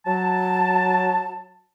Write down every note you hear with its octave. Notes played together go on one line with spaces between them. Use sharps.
F#3 A5